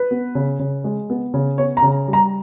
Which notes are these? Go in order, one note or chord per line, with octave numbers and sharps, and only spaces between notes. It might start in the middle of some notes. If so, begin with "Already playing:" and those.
Already playing: B4
B3
C#3
C#3
G#3
B3
C#3
B3 C#5
A#5
C#3
G3
A#5